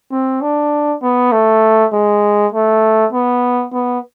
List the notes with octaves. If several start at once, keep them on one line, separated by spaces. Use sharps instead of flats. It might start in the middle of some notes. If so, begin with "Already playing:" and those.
C4
D4
B3
A3
G#3
A3
B3
B3